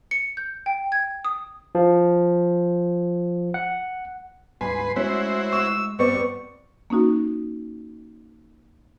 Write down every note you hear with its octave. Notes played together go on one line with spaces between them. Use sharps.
C#7
G6
G5
G#6
D#6
F3
F#5
D2 G#2 G3 B4 G#5 C6
G#3 A3 C#4 E4 F#4 C5 B6
C#6 E6
G2 B3 C4 D5 C#6
A#3 C#4 D#4 F#4